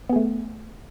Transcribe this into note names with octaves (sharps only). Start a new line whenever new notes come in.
A3 B3 G#4